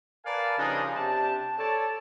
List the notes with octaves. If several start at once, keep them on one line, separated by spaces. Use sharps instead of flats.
A#4 B4 D5 F5 G#5 A5
C#3 F3 G3 D4 D#4 G#4
C3 D4 G4 A5
A4 C#5 D5 A5